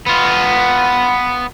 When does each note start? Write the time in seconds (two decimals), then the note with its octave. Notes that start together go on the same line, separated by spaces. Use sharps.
0.07 B3 F4